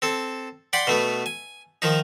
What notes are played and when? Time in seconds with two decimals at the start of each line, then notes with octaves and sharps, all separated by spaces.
0.02 C4 A4
0.73 D5 F#5 G5 B5 C6
0.87 B2 A3 B3
1.26 G#5
1.82 D#3 F3 D#4